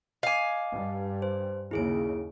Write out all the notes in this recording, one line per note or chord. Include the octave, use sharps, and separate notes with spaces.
D#5 F5 G#5 D6
G2
C5
D#2 C#3 E4 G#4 D7